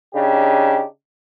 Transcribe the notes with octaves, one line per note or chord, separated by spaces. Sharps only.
C#3 D4 D#4 G4